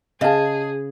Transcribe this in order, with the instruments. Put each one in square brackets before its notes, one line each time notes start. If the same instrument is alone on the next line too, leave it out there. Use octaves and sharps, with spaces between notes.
[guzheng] C#3 [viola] G#4 [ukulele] D#5 A5